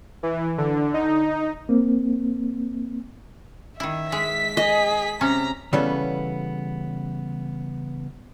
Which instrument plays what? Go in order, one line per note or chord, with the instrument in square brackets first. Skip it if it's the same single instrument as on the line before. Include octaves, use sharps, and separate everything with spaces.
[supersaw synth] E3
D3
D#4
[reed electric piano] A#3 C4
[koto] D#3 E4 [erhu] E5
[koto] G#3 [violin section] B6
[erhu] G#4 [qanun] D#5
[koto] C3 C#4 [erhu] A#5
[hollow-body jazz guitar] C#3 E3 G3 B3 C#4 A4